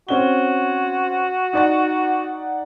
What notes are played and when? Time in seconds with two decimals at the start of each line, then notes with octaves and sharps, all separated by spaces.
0.09 C4 C#4 F#4 G7
1.53 D#4 D5 F#5